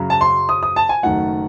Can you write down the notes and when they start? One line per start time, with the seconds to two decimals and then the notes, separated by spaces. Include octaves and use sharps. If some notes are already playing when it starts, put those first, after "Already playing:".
Already playing: F#2 C#3 F#3
0.10 A5
0.21 C6
0.49 D#6
0.63 D#6
0.76 A5
0.89 G#5
1.03 F#1 F#2 D#3 A3 F#5